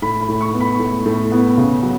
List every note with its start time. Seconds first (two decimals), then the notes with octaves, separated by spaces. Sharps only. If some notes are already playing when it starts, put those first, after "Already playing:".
0.02 A2 B5
0.21 B5
0.28 A2
0.41 C#6
0.54 B3
0.61 B5
0.79 A2
1.06 A2
1.32 B3
1.58 C#3
1.83 F#3